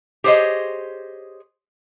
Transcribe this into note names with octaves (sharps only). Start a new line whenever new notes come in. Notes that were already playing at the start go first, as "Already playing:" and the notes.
G4 G#4 C5 C#5 D#5